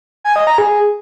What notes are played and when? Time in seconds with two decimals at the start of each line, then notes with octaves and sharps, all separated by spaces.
0.24 G#5
0.36 D#5
0.47 A#5
0.58 G#4